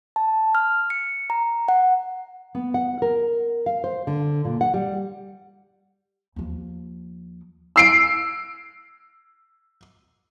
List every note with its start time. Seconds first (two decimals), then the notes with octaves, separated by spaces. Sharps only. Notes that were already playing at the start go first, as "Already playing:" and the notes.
0.16 A5
0.55 F6
0.90 C#7
1.30 A#5
1.68 F#5
2.55 B3
2.74 F#5
3.02 A#4
3.66 F5
3.84 C5
4.07 D3
4.45 A#2
4.61 F#5
4.74 G3
6.36 D#2 F3
7.76 E6 C7 D7